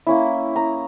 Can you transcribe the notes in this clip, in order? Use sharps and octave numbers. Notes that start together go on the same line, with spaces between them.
A#3 C#4 E4
A#5 D#6